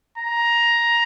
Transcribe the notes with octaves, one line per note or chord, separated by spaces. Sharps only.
A#5